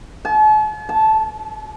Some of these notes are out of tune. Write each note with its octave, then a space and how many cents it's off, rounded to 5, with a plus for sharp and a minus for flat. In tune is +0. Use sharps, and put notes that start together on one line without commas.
A5 -45
A5 -10